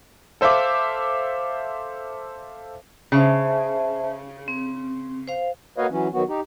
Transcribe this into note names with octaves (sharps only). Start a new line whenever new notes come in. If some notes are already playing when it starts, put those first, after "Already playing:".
A4 C5 E5 F5 D6
C#3 C5 E5 A5
C4
C5 F5
A#3 F#4 B4 C#5 D#5 F5
E3 F#3 C#4
D#3 F#3 B3 F#4
D#4 G4